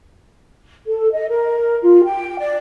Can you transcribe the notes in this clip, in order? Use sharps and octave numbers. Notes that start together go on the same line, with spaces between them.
A4
D#5
A#4
F4
G5
D5